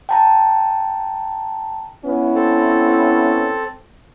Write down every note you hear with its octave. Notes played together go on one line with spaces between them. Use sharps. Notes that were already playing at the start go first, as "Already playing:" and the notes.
G5 A5 A#5
B3 C#4 E4
C4 A4